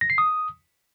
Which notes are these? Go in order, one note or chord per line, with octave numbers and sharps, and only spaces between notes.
A#6
C7
D#6